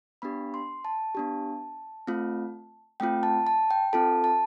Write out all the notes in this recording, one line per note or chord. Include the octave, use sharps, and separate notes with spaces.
B3 D4 G4 B5
C6
A5
B3 D4 G4
A3 C4 F4
A3 C4 F4 G5
A5
A5
G5
C4 F4 A4 A5
A5